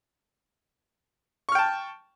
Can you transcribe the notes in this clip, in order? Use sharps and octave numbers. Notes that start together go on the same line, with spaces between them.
G5 A5 C#6 F6